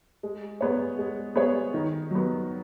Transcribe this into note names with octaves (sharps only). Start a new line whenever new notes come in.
G#3
B3 G#4 C#5
G#3
B3 G#4 C#5
D#3
F#3 B3